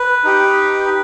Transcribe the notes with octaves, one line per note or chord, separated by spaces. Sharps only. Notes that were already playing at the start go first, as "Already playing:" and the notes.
Already playing: B4
D#4 G4